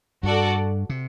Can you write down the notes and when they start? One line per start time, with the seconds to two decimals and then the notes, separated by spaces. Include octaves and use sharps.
0.23 G2 F#4 A4 D5 F#5
0.89 C3